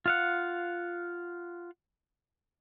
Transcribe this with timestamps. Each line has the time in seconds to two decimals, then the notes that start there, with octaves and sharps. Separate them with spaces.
0.06 F4 F5 F#5